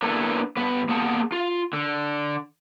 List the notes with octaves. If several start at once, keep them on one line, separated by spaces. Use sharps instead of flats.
A#3 B3 D4 E4 A4 B4
G2 B3 B4
A#3 B3 G#4 F#5 A5
F4
D3